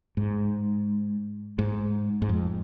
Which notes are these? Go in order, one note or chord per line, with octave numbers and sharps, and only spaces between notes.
G#2
G#2
G#2
F2